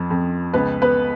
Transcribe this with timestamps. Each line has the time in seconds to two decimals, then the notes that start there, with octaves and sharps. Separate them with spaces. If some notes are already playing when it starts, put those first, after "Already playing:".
Already playing: F2 F3
0.10 F2
0.54 C#2 B3 B4
0.82 B3 B4